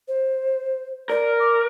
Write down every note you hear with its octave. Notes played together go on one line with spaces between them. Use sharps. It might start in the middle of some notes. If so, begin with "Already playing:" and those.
C5
A#4 D5
D6